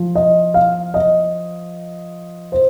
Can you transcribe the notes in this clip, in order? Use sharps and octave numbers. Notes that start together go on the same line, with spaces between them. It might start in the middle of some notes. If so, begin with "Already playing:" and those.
Already playing: F3
D#5
F5
D#5
C5